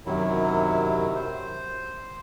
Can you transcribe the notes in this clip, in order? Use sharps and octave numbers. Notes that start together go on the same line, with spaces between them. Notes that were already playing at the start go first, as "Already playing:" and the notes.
F#2 C3 D#3 F#3 E4
C5